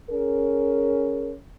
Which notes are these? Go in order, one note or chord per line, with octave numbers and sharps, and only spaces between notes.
C#4 G#4 A#4